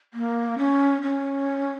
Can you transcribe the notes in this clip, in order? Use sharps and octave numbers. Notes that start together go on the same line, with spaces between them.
A#3
C#4
C#4